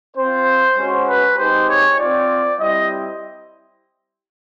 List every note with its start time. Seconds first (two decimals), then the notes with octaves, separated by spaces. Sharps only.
0.17 C4 F4 C5
0.77 G#3 C#4 F#4
1.07 B4
1.37 G#3 C4 D#4 G4 C5
1.68 C#5
1.98 C4 F4 D5
2.59 G3 C4 E4 D#5